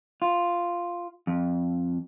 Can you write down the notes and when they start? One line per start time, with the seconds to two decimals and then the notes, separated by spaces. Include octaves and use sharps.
0.22 F4
1.27 F2